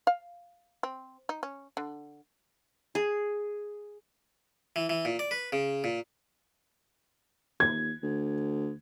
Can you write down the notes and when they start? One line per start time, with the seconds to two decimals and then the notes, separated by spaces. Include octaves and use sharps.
0.07 F5
0.83 C4
1.29 D#4
1.43 C#4
1.77 D3
2.95 G#4
4.76 E3
4.90 E3
5.05 A#2
5.19 D5
5.31 B4
5.53 C#3
5.84 A#2
7.60 D#2 G#6
8.03 D2